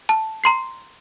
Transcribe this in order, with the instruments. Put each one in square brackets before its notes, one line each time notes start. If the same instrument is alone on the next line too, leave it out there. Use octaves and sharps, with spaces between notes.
[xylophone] A5
A#5 C6 C7